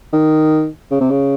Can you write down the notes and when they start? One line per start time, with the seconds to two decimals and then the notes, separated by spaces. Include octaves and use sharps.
0.13 D#3
0.91 C#3
1.01 C3
1.11 C#3